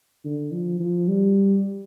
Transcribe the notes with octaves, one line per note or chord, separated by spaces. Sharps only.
D3
F3
F3
G3